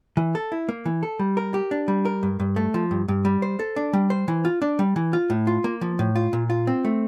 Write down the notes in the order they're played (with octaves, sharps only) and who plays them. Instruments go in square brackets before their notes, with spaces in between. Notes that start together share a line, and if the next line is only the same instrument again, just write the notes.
[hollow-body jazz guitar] E3
A4
E4
A#3
E3
A4
G3
A#4
G4
D4
G3
A#4
G2
G2
A3
F3
G2
G2
G3
C5
A4
D4
G3
C5
E3
F4
D4
G3
E3
F4
A2
F4
A#3
F3
A2
F4
A#2
F4
C4
A3